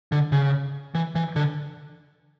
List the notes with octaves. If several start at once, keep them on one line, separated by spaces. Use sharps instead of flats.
D3
C#3
E3
E3
D3